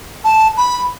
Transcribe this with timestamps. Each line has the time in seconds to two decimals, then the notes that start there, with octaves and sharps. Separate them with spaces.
0.24 A5
0.57 B5